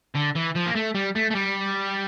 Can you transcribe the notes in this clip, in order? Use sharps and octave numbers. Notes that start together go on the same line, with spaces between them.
D3
E3
F3
A#3
A3
G3
A3
A3
G3